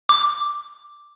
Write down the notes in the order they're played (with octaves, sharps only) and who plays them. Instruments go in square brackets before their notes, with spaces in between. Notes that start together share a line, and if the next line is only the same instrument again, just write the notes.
[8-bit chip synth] D6